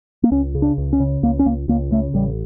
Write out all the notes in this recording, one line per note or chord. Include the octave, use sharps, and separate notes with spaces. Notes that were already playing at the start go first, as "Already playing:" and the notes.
A#3
C#2 C#4
C#3
D4
C#2
C#4
C#3
C#2 A#3
C#4
C#2 A#3
C#2 A#3
C#3 A3
A1 G3